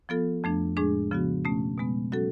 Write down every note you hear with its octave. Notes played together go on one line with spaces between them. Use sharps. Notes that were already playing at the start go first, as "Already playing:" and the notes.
F3 B3 F4 A4
F2 F3 A3 D4
A2 G#3 D4 G#4
C#3 F3 B3 F#4
B2 A3 C#4
B2 G#3 B3
F#3 C#4 F#4 A4